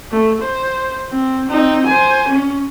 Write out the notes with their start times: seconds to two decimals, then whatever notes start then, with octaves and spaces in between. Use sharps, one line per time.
0.11 A3
0.42 C5
1.08 C4
1.49 C4 D#4
1.87 C5 G#5
2.28 C#4